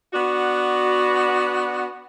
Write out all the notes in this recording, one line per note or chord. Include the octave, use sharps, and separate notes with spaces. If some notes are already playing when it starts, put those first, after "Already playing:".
B3 D4 F#4